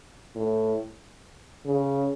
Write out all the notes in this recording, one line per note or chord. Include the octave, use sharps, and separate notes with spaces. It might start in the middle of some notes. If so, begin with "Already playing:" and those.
A2
C#3